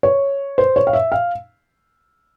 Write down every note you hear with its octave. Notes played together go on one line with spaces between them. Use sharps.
C#5
C5
C#5
F5
E5
F5